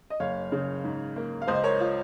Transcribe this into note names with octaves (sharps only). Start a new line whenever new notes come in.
D#5
F#1 C#5 F5
C#3
G#2
A#3
F5
C#2 C5 D#5
A#4 C#5
F4